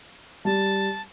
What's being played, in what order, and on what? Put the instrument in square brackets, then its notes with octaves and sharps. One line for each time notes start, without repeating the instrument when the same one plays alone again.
[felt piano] G3 [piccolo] A5